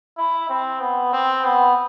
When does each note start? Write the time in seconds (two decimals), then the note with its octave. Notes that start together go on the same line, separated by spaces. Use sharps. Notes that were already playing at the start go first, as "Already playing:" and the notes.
0.18 E4
0.49 C4
0.81 B3
1.13 C4
1.45 B3